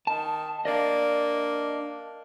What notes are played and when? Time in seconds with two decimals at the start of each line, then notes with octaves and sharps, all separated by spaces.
0.07 D#3 A5
0.65 A#3 D4 D5 D#5